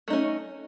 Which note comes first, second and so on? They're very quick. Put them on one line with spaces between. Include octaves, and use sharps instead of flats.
A3 D#4 C#4